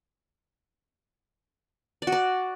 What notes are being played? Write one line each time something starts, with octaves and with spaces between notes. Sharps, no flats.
D5
F#4
D5